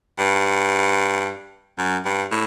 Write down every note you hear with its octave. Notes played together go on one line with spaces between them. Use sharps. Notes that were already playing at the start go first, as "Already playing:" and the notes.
G2
F#2
G2
A2